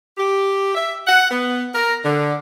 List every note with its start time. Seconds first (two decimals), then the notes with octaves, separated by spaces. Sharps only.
0.18 G4
0.75 E5
1.07 F#5
1.30 B3
1.75 A#4
2.04 D3